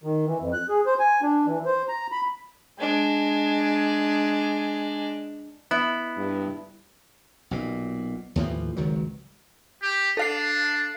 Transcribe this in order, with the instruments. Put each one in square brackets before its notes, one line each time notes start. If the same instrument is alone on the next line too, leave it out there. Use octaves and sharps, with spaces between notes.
[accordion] D#3
E3
F2
F#6
G#4
C5
G#5
D4
E3
C5
A#5
B5
[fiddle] G#3 D4
[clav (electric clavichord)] B3 [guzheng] E4
[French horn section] G2
[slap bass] B1 A#2
D#2 A2 E3 F3
G#1 C#2 D#3 F#3
[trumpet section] G4
[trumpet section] D4 [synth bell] A4 F5 C7